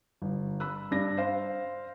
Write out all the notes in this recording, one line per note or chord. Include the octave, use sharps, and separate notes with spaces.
G1
B5 E6 F#6
G2 D4 A#6
C5 F5 C6